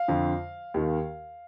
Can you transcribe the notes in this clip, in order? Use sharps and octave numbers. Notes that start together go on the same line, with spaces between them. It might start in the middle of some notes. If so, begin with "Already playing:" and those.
Already playing: F5
F2 D3 F3
D#2 D#3